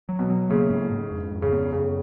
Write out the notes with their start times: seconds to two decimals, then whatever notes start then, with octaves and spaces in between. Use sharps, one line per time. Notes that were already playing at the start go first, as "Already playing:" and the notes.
0.09 F#3
0.19 B2
0.30 F#3
0.49 C#3 A#3
0.70 G#2
0.92 G#2
1.11 F2
1.31 F2
1.42 C#3
1.52 B3
1.73 F#2 C#3